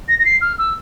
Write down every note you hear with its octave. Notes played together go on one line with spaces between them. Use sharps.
A#6
A#6
C7
F6
E6